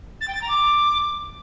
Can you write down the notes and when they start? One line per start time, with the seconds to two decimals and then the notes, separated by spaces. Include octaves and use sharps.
0.20 A6
0.27 G5
0.34 A6
0.41 A#5
0.48 D6